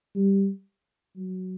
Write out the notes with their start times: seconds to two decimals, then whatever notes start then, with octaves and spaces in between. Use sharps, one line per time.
0.15 G3
1.16 F#3